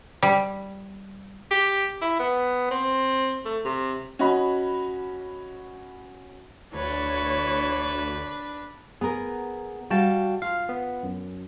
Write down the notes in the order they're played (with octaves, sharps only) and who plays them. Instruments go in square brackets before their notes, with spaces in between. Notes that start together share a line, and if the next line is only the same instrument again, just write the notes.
[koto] G3
[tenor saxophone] G4
E4
B3
C4
A3
C3
[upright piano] C#4 F#4 D#5 B5
[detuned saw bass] D2 [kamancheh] D4 B4 [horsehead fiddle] C#5
[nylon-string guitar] B3 A#4 [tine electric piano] G#4
[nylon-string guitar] G3 F5 [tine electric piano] F#4 G5 A5
[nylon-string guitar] F4 [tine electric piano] F5
[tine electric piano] B3
F#2